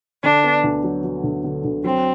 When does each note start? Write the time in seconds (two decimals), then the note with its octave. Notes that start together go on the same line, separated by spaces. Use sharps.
0.23 D3 D4
0.44 B3
0.64 D2
0.84 F#3
1.04 F#3
1.24 D2
1.44 D3
1.64 D2
1.84 F#3 C4